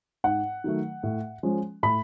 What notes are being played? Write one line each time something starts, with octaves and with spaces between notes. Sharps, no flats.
G#2 F#5
D#3 F#3 A3
A2
F3 G#3 C#4
A2 B5